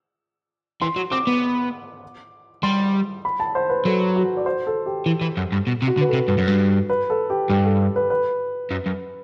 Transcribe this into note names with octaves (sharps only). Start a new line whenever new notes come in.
E3 C6
F#3
C4 D6
B3
G3 C6
B5
A5
C5
B4
F#3 A4
F#4
D5
C5
A4
G4
E3
E3
F#2
G2
B2
C3
F#4
D3
B4
C3 A4
G2 B4
F#2
G2
B4
A4
G4
G2 G4
A4
B4
B4
F#2
F#2